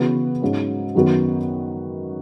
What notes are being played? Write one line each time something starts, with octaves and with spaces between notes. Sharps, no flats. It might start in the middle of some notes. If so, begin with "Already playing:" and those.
Already playing: C#3 E3 B3 F#4 B4
G#2 F#3 C#4
F#2 D#3 F#3 B3 F#4